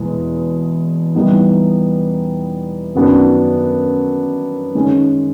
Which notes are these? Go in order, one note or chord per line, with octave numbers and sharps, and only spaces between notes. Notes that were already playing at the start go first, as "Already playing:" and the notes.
Already playing: E2 B2 G#3 B3
E3 G3 B3 D#4
F#2 D#3 F#3 B3 D4
D#3 G#3 C#4